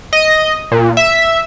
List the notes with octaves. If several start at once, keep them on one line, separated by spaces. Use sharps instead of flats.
D#5
A#2
E5